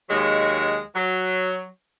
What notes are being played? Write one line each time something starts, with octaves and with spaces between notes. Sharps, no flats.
D#2 F#3 G#3
F#3